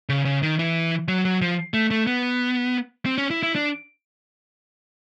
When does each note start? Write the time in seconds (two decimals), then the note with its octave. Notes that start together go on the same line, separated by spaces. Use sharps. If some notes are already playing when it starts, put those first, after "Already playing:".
0.09 C#3
0.25 C#3
0.43 D#3
0.59 E3
1.09 F#3
1.25 F#3
1.42 F3
1.74 A3
1.91 A3
2.07 B3
3.06 C4
3.18 C#4
3.30 E4
3.43 E4
3.55 D4